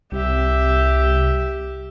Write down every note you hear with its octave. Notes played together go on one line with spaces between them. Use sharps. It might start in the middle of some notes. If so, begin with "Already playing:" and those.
C2 G4 E5